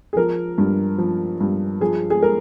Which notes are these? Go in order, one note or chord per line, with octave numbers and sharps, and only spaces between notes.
G#4
F3 A#4
G2
F3
G2
F3 G#4
G#4
A#4